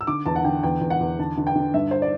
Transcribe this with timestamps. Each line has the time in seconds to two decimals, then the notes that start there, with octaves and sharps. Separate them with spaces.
0.01 E6
0.07 D3 D6
0.26 E2 A5
0.36 F#5
0.45 D3 G5
0.63 E2 G5
0.81 E2
0.90 F#5
1.00 E2
1.19 D3 A5
1.37 D3
1.47 G5
1.55 D3
1.74 G2 E5
1.91 C5
2.02 D5